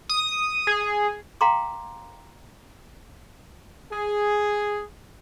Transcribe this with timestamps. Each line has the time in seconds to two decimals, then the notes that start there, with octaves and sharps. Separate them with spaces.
0.09 D#6
0.67 G#4
1.41 F5 G5 A#5 C6 D6
3.91 G#4